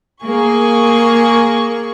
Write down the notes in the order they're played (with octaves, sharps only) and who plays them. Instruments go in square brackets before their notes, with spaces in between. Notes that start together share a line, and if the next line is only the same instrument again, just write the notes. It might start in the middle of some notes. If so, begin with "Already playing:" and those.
[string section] A#3 G#4 C#6